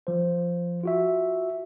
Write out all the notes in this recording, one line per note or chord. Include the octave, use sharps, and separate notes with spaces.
F3 C5
F4 F#4 E5